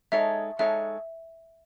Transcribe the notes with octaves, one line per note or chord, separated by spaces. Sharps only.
G#3 D#4 A4 C#5 E5
G#3 D#4 A4 C#5 E5